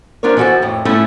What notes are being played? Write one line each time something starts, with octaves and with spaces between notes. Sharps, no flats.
F3 D4 F4 A#4 C#5
E3 F3 E4 F#4 A4 A5
F2 A2
A2 A3 C#4 E4 F4